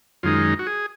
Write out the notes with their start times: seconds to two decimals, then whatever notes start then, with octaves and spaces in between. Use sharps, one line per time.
0.23 F#2 D#3 G#3 D#4 F4
0.59 F#4
0.67 G#4